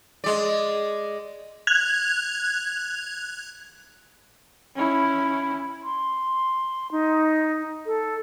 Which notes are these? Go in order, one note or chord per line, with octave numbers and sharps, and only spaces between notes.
G#3 D5
F#6 G#6 F7
C#4 E4
C6
D#4
A4